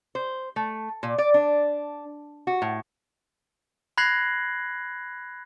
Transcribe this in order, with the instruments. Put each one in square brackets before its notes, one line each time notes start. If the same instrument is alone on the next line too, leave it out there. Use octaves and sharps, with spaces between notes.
[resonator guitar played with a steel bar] C5
A3
A#2
D5
D4
F#4
A2
[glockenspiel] B5 F#6 G#6 A#6 C7 F#7